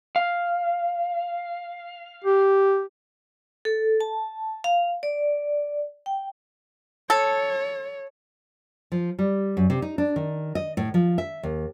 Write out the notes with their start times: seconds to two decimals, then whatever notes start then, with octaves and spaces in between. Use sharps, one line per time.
0.16 F5
2.24 G4
3.65 A4
4.01 A5
4.64 F5
5.03 D5
6.06 G5
7.10 A4 C#5
8.92 F3
9.19 G3
9.57 F#2
9.70 C3
9.82 D#4
9.98 D4
10.16 D#3
10.55 D#5
10.77 A2
10.94 F3
11.18 E5
11.43 D#2